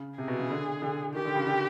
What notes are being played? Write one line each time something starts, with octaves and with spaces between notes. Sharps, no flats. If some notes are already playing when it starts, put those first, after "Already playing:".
Already playing: C#3
C3 G#4
B2
C#3
D3
D3
D#3 G4
D3
C#3
D3